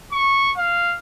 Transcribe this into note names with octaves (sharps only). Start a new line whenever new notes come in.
C#6
F5